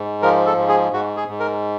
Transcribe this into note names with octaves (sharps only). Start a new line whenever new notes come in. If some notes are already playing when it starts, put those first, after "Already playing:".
Already playing: G#2
F3 A#4
A4
G#2
G#4
G#2 F#4
G#4
G#2
A#4